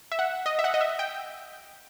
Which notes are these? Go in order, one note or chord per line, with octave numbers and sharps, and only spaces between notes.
E5
F#5
D#5
E5
F#5
D#5
E5
G5